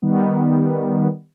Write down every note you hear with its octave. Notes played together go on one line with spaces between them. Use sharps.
D#3 G3 B3